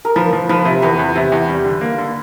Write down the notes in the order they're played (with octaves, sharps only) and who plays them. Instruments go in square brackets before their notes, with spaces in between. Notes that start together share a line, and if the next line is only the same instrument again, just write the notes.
[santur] A#4
[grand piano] F3 [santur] B4
[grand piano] F3
[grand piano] F3 [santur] B4
[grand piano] C3
[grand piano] E2 [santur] B4
[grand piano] E2
C3
E2
G3
D3
A#3
D3